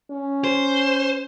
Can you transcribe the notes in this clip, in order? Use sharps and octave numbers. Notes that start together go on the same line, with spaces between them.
C#4
C5